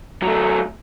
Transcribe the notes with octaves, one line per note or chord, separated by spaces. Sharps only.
F#3 A3